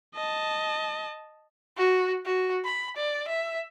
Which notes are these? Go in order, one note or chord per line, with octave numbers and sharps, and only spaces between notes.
D#5 A5
F#4
F#4
B5
D5
E5